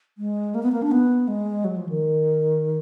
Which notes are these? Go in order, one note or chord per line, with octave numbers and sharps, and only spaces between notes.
G#3
A#3
B3
A#3
D4
B3
G#3
F#3
F3
D#3